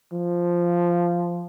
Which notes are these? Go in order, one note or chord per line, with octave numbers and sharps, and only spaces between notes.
F3